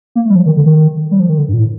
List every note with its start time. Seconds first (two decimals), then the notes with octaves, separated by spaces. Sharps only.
0.15 A#3
0.25 A3
0.30 G3
0.35 F3
0.46 D#3
0.57 D3
0.66 D#3
1.11 G3
1.20 F3
1.29 D#3
1.38 D3
1.48 G2
1.53 A#2
1.59 A2